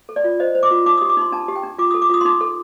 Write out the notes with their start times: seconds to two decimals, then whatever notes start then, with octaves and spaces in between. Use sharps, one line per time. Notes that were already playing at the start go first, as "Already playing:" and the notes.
0.09 A4
0.16 D5
0.24 F4
0.40 C5 D#5
0.55 C5
0.63 D6
0.71 F4
0.86 D#4 D6
0.98 D#6
1.02 G4
1.09 D6
1.17 D#4 C6
1.32 D4 A5
1.48 G4
1.56 G5
1.63 D4
1.78 F4 D6
1.91 D#6
1.94 A4
2.02 D6
2.09 F4 D#6
2.21 C6
2.25 D#4 D6
2.41 A4